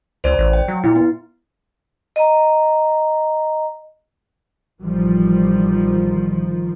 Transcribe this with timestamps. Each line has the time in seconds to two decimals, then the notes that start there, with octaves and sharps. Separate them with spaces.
0.24 C#2 C5 D5
0.38 A1
0.53 G5
0.68 F#3
0.84 A#2 E4
0.96 B3
2.16 D#5 A#5
4.83 A1 D#3 F3 G3